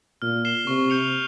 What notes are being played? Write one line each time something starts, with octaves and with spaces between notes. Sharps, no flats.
A#2 F6
C7 E7 G7
C3 C#6
G6 C#7 F7